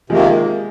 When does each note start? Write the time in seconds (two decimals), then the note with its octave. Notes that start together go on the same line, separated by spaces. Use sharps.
0.10 C3 D#3 F3 G#3 A#3